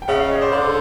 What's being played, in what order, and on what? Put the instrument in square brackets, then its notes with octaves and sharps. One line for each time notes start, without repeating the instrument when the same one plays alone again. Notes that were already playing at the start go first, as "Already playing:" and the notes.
[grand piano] G5
[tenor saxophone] C#3 [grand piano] E5 F#5
[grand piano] D#5 F5
C#5 D#5
C5 D5
[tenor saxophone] D3